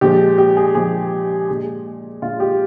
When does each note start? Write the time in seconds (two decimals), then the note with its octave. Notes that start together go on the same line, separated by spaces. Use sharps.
0.01 A#2 F3 G#3 G4
0.38 G4
0.57 G#4
0.75 A#2 F3 G#3 G#4
1.48 A#2 G#3
2.22 A#2 G#3 F4
2.40 G4